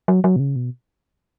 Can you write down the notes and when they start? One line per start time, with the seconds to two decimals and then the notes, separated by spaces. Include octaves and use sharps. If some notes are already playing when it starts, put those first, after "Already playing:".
0.08 F#3
0.24 F#3
0.36 B2
0.40 C#3
0.56 B2